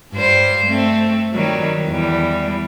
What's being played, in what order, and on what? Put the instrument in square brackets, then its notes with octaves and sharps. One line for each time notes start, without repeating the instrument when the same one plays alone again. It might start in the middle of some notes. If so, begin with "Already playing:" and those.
[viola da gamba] G2 G3 C5
A3 C4
D#3 F#3 G3
E2 G3